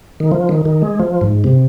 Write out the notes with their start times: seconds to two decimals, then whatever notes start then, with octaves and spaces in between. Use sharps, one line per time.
0.20 D#3
0.32 F3
0.49 D#3
0.65 D#3
0.82 G#3
1.00 F3
1.21 G#2
1.44 C3